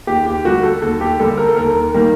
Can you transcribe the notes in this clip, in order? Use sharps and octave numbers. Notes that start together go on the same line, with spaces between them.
D#2 G4
G4
D3 G3 A#3 F#4
A4
D#2 A4
G4
D3 G3 A#3 A4
A#4
A4
D#2 A#4
D#3 G3 A#3